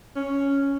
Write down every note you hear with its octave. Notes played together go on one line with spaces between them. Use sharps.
C#4